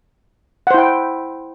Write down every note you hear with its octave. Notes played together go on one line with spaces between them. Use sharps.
E4 C5 F#5 G5